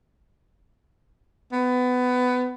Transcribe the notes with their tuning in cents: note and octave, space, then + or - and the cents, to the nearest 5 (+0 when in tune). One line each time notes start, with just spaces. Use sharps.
B3 +20